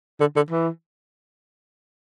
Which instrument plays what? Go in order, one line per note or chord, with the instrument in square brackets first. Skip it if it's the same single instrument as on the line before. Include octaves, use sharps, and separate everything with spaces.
[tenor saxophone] D3
D3
E3